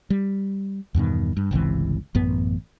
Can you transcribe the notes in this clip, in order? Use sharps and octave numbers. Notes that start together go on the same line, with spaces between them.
G3
E2 G2 B2 D#3
G2
G1 C#2 C3 E3
A1 F#2 B3